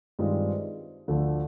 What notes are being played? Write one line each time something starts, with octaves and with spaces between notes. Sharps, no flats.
G2 D#3 G#3 C4 F4
D2 D3 F3 A3